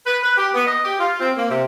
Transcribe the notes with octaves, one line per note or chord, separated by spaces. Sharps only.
B4
B4
G4
B3
D#5
G4
F4
C4
A#3
C3